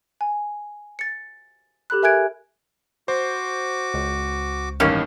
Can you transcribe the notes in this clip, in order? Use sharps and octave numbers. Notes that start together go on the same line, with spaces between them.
G#5
A6 C#7
G4 A4 B5 F#6
A#4 E5 G#5 F#6 G#6 D7
F#4 C5 D6
C#2
A1 G2 D#3 A#3 C#4